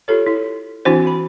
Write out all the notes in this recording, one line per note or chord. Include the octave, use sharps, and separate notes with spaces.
F4 G4 A4 C#5
E4
E3 C4 D4 E4 F#4 C5
F#4 B5